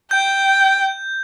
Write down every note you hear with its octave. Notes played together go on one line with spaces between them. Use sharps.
G5 G6